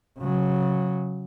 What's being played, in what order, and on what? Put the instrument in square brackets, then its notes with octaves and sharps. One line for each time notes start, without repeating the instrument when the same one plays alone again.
[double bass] C#3 F#3